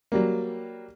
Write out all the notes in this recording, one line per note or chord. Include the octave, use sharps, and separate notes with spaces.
F#3 G3 A#3